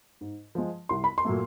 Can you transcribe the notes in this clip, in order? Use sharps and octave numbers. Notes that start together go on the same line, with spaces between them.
G#2
F3 G#3
C2 C6
B5
C6
A#2 F#3 A3